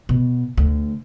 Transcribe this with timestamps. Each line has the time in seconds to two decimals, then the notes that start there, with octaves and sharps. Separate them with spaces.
0.09 B2
0.57 D2